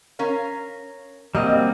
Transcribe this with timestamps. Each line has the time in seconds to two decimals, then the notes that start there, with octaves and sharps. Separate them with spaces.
0.19 C#4 A#4 F5
1.35 F#3 G3 A#3 C4 D#5